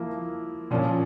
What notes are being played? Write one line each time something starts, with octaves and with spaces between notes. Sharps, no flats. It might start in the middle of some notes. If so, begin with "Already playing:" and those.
Already playing: F3 A#3 E4 A#4
A#2 F3 C#4